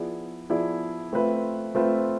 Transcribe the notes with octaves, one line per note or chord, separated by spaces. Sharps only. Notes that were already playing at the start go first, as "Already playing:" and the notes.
Already playing: F3 B3 E4 G#4 D5
F3 B3 E4 G#4 D5
A3 C4 F4 B4 E5
A3 C4 F4 B4 E5